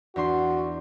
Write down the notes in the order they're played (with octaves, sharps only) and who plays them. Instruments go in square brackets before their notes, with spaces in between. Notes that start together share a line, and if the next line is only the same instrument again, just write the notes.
[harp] E2 D4 C6 [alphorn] F#4